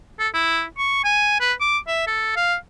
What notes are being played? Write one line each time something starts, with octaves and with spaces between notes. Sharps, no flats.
A4
E4
C#6
G#5
B4
D6
E5
A4
F5